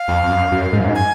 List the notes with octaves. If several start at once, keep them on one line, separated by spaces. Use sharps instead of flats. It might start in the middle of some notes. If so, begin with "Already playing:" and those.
Already playing: F5
F2
F2
F#2
F#2
G#2
F#2
G#2
G#5